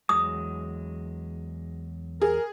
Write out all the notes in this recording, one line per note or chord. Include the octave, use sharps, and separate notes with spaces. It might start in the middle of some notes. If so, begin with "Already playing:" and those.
E2 F#3 G#3 D#6
G#4 A#4